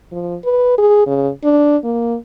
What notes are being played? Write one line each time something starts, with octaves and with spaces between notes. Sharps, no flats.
F3
B4
G#4
C#3
D4
A#3